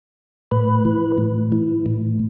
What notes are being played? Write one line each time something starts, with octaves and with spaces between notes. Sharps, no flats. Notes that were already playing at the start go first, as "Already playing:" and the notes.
A2 B4
E3
A2
E3
A2